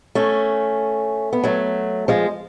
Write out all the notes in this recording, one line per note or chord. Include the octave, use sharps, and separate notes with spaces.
A3 C#4
B3
F#3 A3
F3 G#3